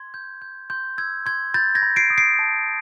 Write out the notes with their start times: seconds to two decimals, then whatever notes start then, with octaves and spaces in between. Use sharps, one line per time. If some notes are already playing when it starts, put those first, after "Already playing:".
Already playing: C6 G#6
0.14 G6
0.42 G6
0.70 C6 G6
0.98 E6 G#6
1.26 C6 G#6
1.54 B5 G6 A6
1.75 G#6 A#6
1.82 B5
1.96 C7 D7
2.10 D#6
2.18 C7 D7
2.39 A5